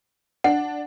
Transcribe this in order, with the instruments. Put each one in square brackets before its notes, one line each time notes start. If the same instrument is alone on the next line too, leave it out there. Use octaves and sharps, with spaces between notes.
[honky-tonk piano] D4 [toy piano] F#5